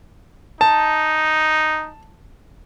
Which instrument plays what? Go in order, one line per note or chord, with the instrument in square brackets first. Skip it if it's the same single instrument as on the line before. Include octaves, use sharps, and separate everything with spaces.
[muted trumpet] D#4 [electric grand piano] A5